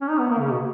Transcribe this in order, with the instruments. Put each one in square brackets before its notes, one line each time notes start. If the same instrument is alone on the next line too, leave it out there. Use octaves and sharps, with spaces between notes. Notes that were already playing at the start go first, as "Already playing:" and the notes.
[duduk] C#4
D#4
B3
A#3
C#3
B2